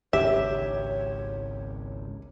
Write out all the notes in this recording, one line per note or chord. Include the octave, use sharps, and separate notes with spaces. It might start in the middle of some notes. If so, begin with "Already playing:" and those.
G#1 C#2 G#2 G4 C#5 E5